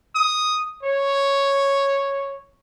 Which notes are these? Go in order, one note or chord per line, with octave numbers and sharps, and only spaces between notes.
D#6
C#5